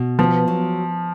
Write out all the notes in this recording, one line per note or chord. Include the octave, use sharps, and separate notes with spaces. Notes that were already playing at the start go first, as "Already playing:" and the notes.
Already playing: B2
F3 B3
F#3